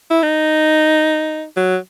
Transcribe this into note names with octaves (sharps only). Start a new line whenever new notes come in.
E4
D#4
F#3